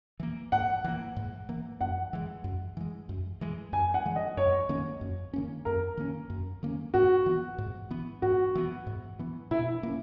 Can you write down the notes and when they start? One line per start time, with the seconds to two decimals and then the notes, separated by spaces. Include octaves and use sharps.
0.20 E3 A#3
0.52 G#2 F#5
0.84 E3 A#3
1.16 G#2
1.49 E3 A#3
1.81 F#2 F#5
2.13 E3 G#3
2.44 F#2
2.77 E3 G#3
3.09 F#2
3.41 E3 G#3
3.73 F#2 G#5
3.94 F#5
4.05 E3 G#3
4.16 D#5
4.37 F#2 C#5
4.69 D#3 A#3 C#4
5.01 F#2
5.33 D#3 A#3 C#4
5.65 F#2 A#4
5.97 D#3 A#3 C#4
6.30 F#2
6.63 D#3 A#3 C#4
6.94 G#2 F#4
7.26 E3 B3
7.58 G#2
7.90 E3 B3
8.22 G#2 F#4
8.55 E3 B3
8.87 G#2
9.19 E3 B3
9.51 B2 E4
9.83 A#3 C#4